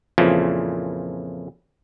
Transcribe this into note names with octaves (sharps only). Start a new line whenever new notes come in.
F2 A#2 C#3 E3 F3